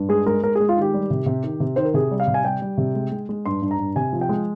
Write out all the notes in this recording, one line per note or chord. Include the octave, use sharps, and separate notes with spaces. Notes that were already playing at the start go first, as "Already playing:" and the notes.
Already playing: G2
G#3 G#4
G#3 A#4
G#3 A#4
G#4
G#3
F4
D#3 G4
G3
C3
C3
D#3
C3
D#3 C5
A#4
C3 G#4
G3
F5
C3
G#5
G3 G5
G3
C3
G#3
G#3
G#3
G2 C6
G2
A#5
G2
C3 G#5
F3
G5
G#3